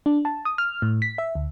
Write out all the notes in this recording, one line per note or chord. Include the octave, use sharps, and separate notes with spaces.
D4
A5
D#6
F6
A2
B6
E5
D2